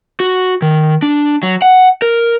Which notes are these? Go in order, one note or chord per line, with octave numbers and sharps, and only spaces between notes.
F#4
D#3
D4
F#3
F#5
A#4